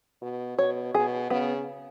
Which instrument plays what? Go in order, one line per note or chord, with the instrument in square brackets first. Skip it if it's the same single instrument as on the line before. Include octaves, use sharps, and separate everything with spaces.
[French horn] B2
[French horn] B2 [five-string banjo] C#5
[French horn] B2 [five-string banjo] G#4
[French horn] C#3 [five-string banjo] B3